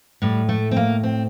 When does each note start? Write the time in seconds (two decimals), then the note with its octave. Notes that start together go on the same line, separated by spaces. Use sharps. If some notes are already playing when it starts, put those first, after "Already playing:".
0.22 A2 G3
0.49 A3
0.71 C4
0.77 A#3
1.03 C4